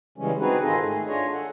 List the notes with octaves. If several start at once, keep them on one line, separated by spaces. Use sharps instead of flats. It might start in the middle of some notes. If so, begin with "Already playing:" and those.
C#3 E3 G3 G#3 C#4
C4 D#4 F#4 G#4 B4
G#2 D#3 F4 G#4 A4 D#5
A3 G#4
D4 F4 G#4 C#5 D#5
A4 F#5